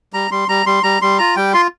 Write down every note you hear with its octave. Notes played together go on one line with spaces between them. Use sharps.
G3 A#5
G3 C6
G3 A#5
G3 C6
G3 A#5
G3 C6
F4 A#5
G3 G5
F4 C6